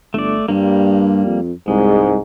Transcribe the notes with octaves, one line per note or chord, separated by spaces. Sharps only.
G1 A3 D5
G2 G3 A#3
F2
C2 G#2 G#3